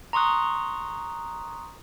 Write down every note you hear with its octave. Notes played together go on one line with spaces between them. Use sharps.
A#5 C6 C#6 D#6 F#6